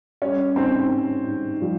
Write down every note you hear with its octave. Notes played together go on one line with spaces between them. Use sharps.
G3 C#4 C#5
G#2 C4 C5
G3
G#2
F3 G3 F4